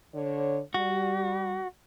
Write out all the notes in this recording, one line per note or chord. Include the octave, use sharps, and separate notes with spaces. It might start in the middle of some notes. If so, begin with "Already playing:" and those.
D3 C#5
G3 F#4